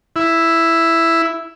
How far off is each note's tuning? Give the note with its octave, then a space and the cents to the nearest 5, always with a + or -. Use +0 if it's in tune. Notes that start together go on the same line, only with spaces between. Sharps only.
E4 +5